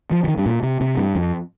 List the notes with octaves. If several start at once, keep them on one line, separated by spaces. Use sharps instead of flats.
F3
F3
D#3
G2
A#2
C3
C3
G2
F2